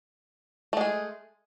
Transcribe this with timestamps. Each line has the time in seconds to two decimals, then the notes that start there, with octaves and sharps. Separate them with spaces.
0.73 A3
0.77 G#3
0.81 G#4